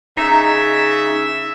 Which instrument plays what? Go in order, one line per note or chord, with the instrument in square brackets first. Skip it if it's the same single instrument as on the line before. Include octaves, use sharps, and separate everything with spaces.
[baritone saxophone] C#3 [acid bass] D#4 [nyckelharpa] E5